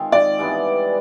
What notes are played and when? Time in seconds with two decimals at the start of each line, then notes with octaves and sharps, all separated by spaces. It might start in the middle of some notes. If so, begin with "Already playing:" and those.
Already playing: D#3 G#3 C4 F4
0.12 D5
0.38 G2 E3 G#3 B3